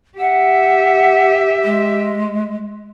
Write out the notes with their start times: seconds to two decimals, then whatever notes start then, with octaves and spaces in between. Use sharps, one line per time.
0.18 G4 E5 F#5
1.64 G#3